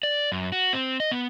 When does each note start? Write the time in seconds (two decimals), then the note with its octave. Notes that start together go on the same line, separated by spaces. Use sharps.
0.03 D5
0.32 F#2
0.52 F#4
0.73 C4
1.00 D#5
1.12 B3